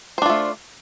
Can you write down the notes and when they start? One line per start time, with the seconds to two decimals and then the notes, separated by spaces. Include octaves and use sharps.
0.18 C5
0.22 D4
0.26 F4
0.30 A3